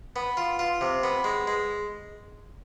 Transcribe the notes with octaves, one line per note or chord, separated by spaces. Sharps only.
B3
F4
F4
C3
B3
G#3
G#3